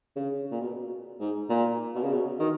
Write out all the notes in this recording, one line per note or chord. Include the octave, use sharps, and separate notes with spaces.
C#3
A#2
B2
G#2
A#2
B2
C#3
B2
D#3